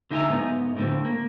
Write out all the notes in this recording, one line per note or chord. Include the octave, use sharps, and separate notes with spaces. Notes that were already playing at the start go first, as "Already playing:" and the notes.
D3 D#4 E5 G5 G#5 A#5
G#2 B3 D#4
A2 D3 C4
A#3